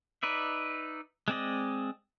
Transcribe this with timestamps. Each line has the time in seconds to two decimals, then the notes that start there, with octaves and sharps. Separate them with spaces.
0.23 D#4 B4 D5 E5
1.28 G#3 C4 D5 D#5